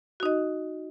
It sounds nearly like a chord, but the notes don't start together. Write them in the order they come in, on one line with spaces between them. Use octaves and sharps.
F#4 D#4 D#5